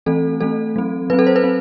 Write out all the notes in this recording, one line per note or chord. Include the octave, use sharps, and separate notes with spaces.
E3 A3 C4 A4
E3 A3 C4 A4
F#3 C4
F#3 C4 B4
A4
C5
B4
C4